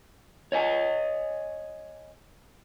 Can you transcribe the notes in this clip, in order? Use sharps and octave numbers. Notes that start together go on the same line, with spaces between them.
C#5 D#5 G#5